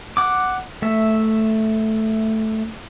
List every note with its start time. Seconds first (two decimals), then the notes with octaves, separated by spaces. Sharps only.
0.17 F#5 D6
0.82 A3 E5